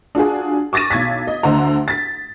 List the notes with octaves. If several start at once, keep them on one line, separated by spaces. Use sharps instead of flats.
D4 F4 F#4 G#4
C#6 D6 A6 A#6 D#7
B1 G#6 A6 B6
D#5
D2 D3 C5 F#5 A#5
A6 B6